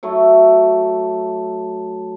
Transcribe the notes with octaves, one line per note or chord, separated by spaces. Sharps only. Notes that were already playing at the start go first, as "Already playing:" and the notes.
F#3 A3 E4